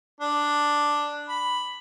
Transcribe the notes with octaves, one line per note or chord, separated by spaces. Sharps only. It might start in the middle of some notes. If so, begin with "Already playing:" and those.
D4
B5